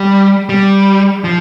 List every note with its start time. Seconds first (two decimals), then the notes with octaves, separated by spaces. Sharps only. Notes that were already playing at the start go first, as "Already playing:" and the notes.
Already playing: G3
0.49 G3
1.24 F3